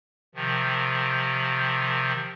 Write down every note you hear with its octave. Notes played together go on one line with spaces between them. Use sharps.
C3 D#3 F3